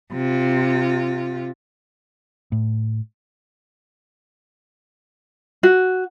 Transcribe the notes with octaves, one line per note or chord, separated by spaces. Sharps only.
C3 F4
A2
F#4